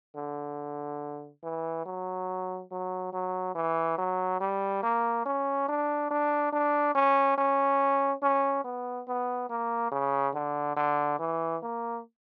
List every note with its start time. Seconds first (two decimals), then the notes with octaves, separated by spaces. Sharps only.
0.16 D3
1.43 E3
1.86 F#3
2.71 F#3
3.13 F#3
3.55 E3
3.98 F#3
4.40 G3
4.83 A#3
5.25 C#4
5.68 D4
6.11 D4
6.52 D4
6.95 C#4
7.38 C#4
8.23 C#4
8.64 B3
9.08 B3
9.50 A#3
9.92 C#3
10.35 D3
10.76 D3
11.19 E3
11.62 A#3